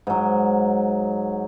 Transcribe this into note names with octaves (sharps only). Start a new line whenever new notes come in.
G#2 F#3